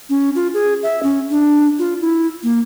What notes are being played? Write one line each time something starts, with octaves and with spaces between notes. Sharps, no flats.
C#4
F4
G#4
E5
C#4
D4
F4
E4
A#3